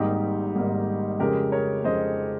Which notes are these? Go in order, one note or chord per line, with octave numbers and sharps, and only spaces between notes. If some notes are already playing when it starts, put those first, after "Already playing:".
Already playing: G#1 G#2 G3 A#3 D#4 G4
G#1 G#2 G3 A#3
F2 C#3 G#3 G4 A#4
A#4 C#5
F2 C#3 G#3 C5 D#5